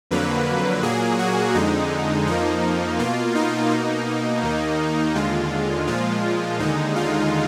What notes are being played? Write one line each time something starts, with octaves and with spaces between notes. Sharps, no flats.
F2 D3 F#3 A#3 B4
A#2 F#3 A#3 G#4
F#4
F2 D3 G#3 D#4
F2 F3 A#3 D#4
B2 A#3 F4
D#4
B2 A#3
D#2 D#3 A#3
D#2 D3 G#3 F4
A#2 F3 G#3 F4
D#2 D3 G#3 D#4
F4